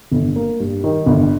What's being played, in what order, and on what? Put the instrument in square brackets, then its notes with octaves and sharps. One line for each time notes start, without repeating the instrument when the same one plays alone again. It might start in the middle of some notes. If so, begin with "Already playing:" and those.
[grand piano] G1
A#3
G2
D#3
G1